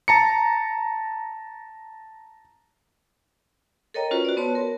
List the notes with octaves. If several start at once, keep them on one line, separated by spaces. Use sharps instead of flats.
A5 A#5 C#7
A4 A#4 C#5 D#5 G5 A#5
C#4 F4 F#4 B4 C5
F#4 D5
B3 B4 C#5 A5 C6
A#4